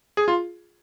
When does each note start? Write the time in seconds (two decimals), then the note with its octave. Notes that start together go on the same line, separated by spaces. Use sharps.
0.17 G#4
0.28 F4